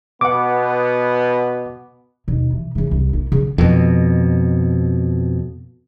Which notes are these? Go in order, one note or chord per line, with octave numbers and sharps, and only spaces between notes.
B2 B3 F#5 D6
D#2 B2
E3
C#3 E3
C2
A#3 E4
C#3
F2 B2